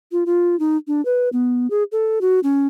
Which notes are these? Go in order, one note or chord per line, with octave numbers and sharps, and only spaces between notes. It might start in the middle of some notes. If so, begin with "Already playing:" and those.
F4
F4
D#4
D4
B4
B3
G#4
A4
F#4
C#4